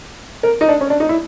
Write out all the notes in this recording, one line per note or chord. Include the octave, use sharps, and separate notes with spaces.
A#4
D#4
D4
C#4
D4
D#4
E4